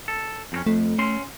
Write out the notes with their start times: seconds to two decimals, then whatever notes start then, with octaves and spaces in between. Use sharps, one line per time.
0.08 A4
0.52 F2 C4 C#4
0.67 F2 A3
0.99 C#4 C6